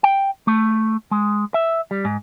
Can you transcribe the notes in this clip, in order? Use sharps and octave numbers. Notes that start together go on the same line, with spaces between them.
G5
A3
G#3
E5
G3
G#2